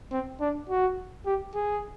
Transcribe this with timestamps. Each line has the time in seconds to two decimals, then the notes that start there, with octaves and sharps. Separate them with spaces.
0.12 C4
0.41 D4
0.69 F#4
1.26 G4
1.55 G#4